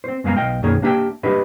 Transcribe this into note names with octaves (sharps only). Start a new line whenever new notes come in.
C4 C5
F#2 G#3 B3 F5 G#5 A#5
B1 D#5 F5 G5
B1 F#2 D#3 A#3 G#4 C#5
A#3 D4 G4 G#4 E5 G5
D4 F#4 G4 B4 D#5 E5